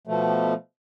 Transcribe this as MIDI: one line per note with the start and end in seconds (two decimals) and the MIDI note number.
0.07 0.54 47
0.07 0.54 53
0.07 0.54 57